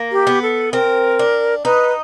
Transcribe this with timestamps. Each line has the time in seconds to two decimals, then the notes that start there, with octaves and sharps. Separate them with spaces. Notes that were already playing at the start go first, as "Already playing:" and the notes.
Already playing: A#3
0.12 G4
0.27 B3
0.42 A4
0.72 C4 A#4
1.19 D4
1.65 D#4 B4